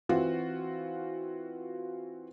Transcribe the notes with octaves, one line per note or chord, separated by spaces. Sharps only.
E3 C4 F4 F#4